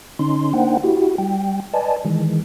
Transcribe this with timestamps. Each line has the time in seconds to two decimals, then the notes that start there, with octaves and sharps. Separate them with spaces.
0.19 D3 C#4 D#4 C6
0.53 A#3 D4 D#4 C5 F#5 G5
0.83 E4 F#4 G4
1.18 G3 G5
1.73 B4 D5 D#5 G#5 A5
2.05 D#3 E3 G#3